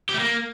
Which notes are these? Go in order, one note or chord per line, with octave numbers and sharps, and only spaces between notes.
G4
A3
A#3